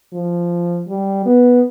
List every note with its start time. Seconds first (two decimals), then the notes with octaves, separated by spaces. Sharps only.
0.13 F3
0.89 G3
1.26 B3